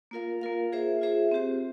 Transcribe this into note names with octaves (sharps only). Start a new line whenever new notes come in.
A#3 F4 A#4 F5
A#3 F4 A#4 F5
F4 G#4 C5 E5
F4 G#4 C5 E5
C4 G4 C5